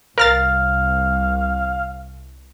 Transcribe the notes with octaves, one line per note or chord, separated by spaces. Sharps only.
C2 A#4 F5 F6 A6